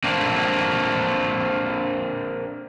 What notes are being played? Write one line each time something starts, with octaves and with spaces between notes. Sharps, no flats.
A#3 C4 D4